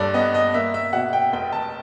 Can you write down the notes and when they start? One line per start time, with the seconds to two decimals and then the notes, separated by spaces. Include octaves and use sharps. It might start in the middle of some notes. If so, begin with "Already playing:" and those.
Already playing: F#1 G2 A4 D5
0.14 B3 D#5
0.34 D#5
0.54 A#3 E5
0.74 E5
0.93 B2 F#5
1.13 G5
1.33 F1 G5
1.53 A5